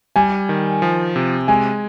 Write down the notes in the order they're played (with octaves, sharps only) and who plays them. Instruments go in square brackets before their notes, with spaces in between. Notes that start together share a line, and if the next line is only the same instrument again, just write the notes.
[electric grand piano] G3 [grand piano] G#5
[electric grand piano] D#3
F3
C3
[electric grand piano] G#3 [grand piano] G#5